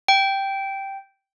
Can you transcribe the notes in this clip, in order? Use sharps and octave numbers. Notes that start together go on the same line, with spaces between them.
G5